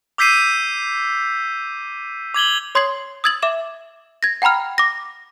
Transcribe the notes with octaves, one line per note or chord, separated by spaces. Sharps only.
D6 E6 G6 B6 C7 D#7
D6 G#6 F#7 G7
C#5 C6 D#6 G#6 C7 F#7
D#6 E6 G#6 A6 F#7
E5 D6 E7
G#6 A#6
F#5 G5 A#5 B5 F6
D6 A#6